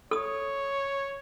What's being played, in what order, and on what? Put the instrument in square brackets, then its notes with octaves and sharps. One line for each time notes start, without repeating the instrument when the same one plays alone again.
[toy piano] A4 D#6 [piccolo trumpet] C#5